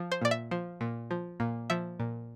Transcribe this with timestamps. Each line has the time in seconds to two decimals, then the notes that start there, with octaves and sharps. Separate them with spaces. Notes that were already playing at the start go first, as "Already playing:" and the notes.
Already playing: F3
0.11 C5
0.21 A#2 D5
0.31 E5
0.51 F3
0.81 A#2
1.11 F3
1.40 A#2
1.70 F3 E5
2.00 A#2